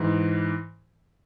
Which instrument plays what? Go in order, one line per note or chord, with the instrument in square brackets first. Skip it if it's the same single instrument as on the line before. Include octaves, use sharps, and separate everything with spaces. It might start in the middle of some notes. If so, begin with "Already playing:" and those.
Already playing: [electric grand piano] G#2 E3